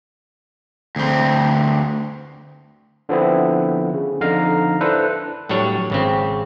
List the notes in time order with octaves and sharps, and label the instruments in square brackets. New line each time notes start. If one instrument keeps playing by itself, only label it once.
[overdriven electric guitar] D2 C4
[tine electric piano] D3 F3 B3 C4 E4
C#3
F2 D3 D#4 F5 A#5 F6
D4 E4 A4 B4 C5
[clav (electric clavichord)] A2 F#3 G3 D4 C#5
G#1 C#3 C4